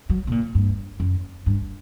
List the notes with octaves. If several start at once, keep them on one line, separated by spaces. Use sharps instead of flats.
F#3
B2
A#2
G2
F#2
G2